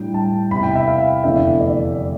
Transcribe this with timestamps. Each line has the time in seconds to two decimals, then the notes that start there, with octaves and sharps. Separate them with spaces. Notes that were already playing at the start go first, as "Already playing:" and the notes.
Already playing: A2 G3 D4 G5
0.14 A5
0.51 E2 C3 E3 B5
0.63 G5
0.76 E5
0.87 F5
1.24 F1 E2 D3 A3 E4 E5
1.60 D5